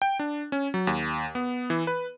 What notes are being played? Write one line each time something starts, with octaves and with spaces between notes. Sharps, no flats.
G5
D4
C#4
F#3
D#2
B3
E3
B4